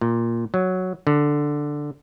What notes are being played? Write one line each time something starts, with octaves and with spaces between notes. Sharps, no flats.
A#2
F#3
D3